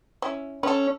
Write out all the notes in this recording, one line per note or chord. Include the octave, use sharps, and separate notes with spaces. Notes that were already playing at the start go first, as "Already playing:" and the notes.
C#4 E4
C#4 A4 B4